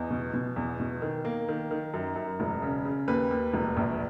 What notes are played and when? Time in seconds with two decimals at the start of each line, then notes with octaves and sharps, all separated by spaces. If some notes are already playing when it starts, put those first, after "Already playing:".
Already playing: E2 D#5
0.11 B2
0.33 B2
0.56 E2
0.80 B2
1.02 D#3
1.25 A#3
1.48 D#3
1.71 D#3
1.94 F#2
2.16 F#2
2.40 E1
2.62 C#3
2.85 C#3
3.08 D#2 B4
3.31 D#2
3.54 E1
3.77 A#1